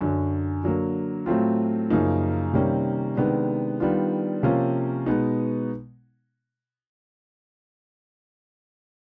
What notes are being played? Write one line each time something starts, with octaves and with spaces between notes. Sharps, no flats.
F#2 D3 F#3
D3 F#3 A#3
A2 F#3 A3 C4 F4
F#2 C#3 F3 A#3 D#4
C3 D#3 G3 A#3 C#4
C3 D#3 G#3 B3 D4
D#3 G3 B3 D4 F4
C3 F3 A#3 C#4 F4
B2 G#3 B3 D#4